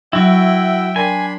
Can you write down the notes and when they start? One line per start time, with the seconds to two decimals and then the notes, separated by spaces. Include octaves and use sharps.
0.13 F#3 E4 F#4 E5 G5
0.96 D4 A#4 G5 G#5 B5 C6